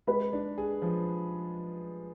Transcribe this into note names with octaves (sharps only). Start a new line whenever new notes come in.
G#3 B4 B5
D4
G#4
F3